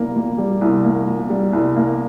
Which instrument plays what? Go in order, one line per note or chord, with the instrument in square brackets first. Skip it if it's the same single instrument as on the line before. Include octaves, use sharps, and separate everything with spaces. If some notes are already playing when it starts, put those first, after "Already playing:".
Already playing: [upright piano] C2 G3 A#3
A#2
G3
C2
A#3
A#2
G3
C2
A#3